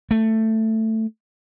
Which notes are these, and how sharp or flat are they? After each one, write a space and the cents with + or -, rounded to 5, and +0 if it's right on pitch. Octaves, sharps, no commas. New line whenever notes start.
A3 +10